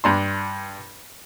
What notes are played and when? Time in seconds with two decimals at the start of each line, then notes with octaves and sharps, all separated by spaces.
0.04 G2 D4 C6